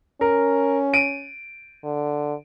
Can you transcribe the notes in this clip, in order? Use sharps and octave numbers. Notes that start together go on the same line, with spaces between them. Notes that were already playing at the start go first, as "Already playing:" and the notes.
C#4 A#4
D7 D#7
D3